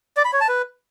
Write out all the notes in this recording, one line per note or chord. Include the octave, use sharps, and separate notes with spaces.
D5
B5
C#5
A5
B4